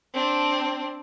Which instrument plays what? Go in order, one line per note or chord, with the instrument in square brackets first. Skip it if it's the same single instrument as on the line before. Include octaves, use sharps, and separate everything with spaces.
[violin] C4 D4